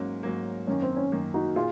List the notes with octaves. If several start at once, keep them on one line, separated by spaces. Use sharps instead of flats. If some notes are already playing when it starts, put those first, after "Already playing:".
Already playing: G#2 F#3 A#3 C#4
G#2 F#3 A#3
F#2 D#3 A#3 C#4
C4
C#4
F#2 D#3 A#3
D#4 F#4
A#2 F4 G#4